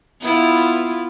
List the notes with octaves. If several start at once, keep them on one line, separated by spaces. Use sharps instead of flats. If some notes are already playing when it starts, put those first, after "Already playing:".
B3 E4 F4